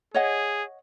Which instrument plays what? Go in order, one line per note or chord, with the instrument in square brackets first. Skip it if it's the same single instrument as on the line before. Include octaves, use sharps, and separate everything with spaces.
[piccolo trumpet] G#4 [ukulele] C#5 D#5 F#5